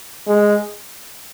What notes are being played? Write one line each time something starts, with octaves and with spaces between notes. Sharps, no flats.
G#3